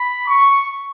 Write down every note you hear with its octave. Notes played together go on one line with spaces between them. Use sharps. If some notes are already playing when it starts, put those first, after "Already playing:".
Already playing: B5
C#6